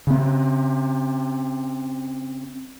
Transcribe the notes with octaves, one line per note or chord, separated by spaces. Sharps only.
C#3 C4